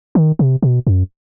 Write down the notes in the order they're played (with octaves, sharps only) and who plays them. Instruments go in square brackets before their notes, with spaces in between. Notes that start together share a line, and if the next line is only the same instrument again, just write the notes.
[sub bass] D#3
C3
B2
F#2